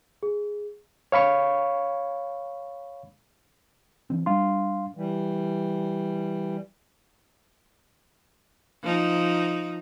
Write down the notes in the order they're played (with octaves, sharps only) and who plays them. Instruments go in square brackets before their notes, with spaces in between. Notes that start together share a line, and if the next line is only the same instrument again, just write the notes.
[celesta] G#4
[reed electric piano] C#5 F5 B5 C#6
[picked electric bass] E3 C4
[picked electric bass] G3 D4 [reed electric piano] F5 C6
[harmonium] E3 G3
[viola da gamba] F3 D#4